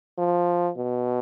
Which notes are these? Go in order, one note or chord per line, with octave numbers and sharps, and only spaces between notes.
F3
B2